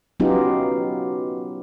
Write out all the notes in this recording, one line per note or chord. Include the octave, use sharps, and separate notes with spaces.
F#3 B3 C#4 D#4 F4 G4